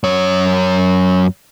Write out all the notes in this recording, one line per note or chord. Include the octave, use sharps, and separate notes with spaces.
F#2 C#5